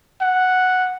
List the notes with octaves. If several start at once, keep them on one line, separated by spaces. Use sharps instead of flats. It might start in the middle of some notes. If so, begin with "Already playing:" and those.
F#5